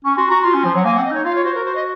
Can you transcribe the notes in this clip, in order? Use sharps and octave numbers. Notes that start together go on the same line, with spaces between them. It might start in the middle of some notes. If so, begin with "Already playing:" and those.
C#4 C#6
F#4 C6
F#4 A#5
F4 C6
C#4
F3
F#3 F#5
A#3 G#5
C4 F#5
D#5
D#4 C#5
F4 F5
C#5
F#4 C5
A#4
C5
D#5